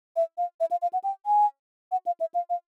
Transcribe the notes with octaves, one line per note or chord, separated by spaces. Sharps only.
E5
F5
E5
F5
F5
F#5
G5
G#5
F#5
F5
E5
F5
F5